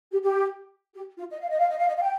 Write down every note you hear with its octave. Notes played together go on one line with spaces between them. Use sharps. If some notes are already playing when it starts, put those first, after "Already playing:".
G4
G4
G4
F4
D#5
F5
D#5
F5
D#5
F5
D#5
F5
G5